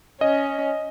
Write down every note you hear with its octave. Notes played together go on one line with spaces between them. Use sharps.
C#4 D#5